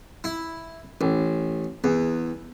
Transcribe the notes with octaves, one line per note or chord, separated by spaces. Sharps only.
E4
A1
E2